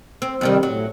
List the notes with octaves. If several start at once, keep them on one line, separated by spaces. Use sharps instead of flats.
C4
F2 C3 D#3 G3 C4
A2 F#3